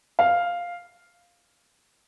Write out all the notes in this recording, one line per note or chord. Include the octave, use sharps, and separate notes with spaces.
F5